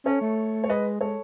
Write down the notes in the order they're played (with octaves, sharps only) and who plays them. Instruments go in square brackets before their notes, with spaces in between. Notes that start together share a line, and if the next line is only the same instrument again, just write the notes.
[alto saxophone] C#4 [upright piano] A4 C#5
[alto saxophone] A3
[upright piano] C#5
[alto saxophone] G#3 [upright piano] B4 D#5
[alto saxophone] G#3 [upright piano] A4 C#5